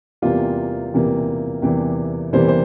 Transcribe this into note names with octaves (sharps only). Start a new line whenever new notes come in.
E2 C3 E3 G3 A#3 F4
E2 C3 E3 G3 A#3
E2 C3 E3 G3 A#3 G4
E2 C3 E3 G3 A#3 C5
C5